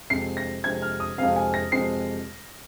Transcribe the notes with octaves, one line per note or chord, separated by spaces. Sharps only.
F2 C3 G#3 C4 C7
A#6
F2 C3 G#3 C4 G#6
F6
D#6
F2 C3 G#3 C4 F5
G#5
A#6
F2 C3 G#3 C4 C7